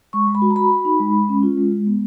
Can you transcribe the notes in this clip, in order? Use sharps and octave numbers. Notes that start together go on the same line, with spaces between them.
G#3 C#6
G#3
B5
F#4
A#5
F#4 B5
F#4
D#4
G#3
G#3
C#4
F4
G#3
G#3
B3